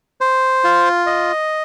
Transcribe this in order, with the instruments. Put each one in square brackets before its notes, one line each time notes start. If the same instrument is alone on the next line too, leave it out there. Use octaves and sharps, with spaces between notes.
[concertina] C5
F4
D#5